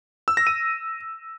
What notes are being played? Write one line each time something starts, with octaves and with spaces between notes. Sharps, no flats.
E6
A#6
D#7